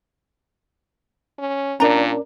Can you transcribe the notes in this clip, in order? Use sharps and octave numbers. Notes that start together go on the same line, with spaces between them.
C#4
A#2 C#4 D4 A#4 D5 A#5